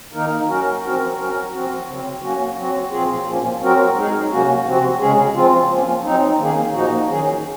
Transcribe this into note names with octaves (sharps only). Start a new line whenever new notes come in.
D#3 A#3 D#4 A#4
F#3 C#4 F#4 A#4
F3 C4 F#4 A#4
F#3 C#4 F#4 A#4
F3 C4 F#4
C#3 F#3 C4
F#3 A#3 C#4 F#4
F#3 C4 F#4
A#2 F3 C4 F4 G#4
A#2 F3 A#3 C#4
F#3 C4 F#4 A#4
G#3 D#4 G#4
C3 F#3 A#3 C#4 F#4
C3 F3 C4 F#4
C#3 G#3 C#4 G#4
F3 C4 F4
F3 A#3 C#4
F#3 C4 D#4
D#3 A#3 C#4 G#4
A#2 F3 A#3 D#4 F#4
D#3 F#3 C#4 G#4